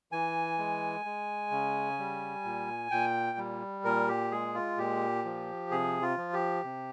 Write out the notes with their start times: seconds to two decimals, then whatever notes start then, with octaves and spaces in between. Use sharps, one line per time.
0.12 E3 G#5
0.58 G#3
1.05 G#3
1.51 C#3
1.99 G3
2.45 A#2
2.91 A#2 G5
3.38 G3
3.84 A#2 A#4
4.08 G4
4.31 G#3 G#4
4.55 F4
4.77 A#2 G4
5.25 F3
5.71 C3 G#4
6.02 F4
6.17 F3
6.33 G4
6.64 C3